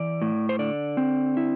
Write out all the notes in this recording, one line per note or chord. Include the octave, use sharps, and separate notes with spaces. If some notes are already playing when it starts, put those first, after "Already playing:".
Already playing: E3 D5
A2
C5
D3 D5
C4
E4